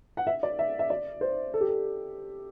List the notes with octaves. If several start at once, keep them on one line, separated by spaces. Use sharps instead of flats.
F#5
E5
D5
E5
E5
D5
C5
A4
G4
A4